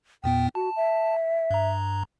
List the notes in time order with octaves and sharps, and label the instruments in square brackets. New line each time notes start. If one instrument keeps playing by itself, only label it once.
[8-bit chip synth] E2 A#2 B3 [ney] G5
[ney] F#4 [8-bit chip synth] A5
[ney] E5
[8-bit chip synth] G2 A#5